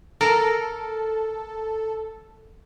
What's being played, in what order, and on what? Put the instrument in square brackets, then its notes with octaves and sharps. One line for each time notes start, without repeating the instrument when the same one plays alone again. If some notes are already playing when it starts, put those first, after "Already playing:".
[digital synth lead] A4 [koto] A#4